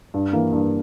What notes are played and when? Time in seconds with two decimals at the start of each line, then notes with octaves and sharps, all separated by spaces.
0.14 G2
0.33 E3 A#3
0.53 G2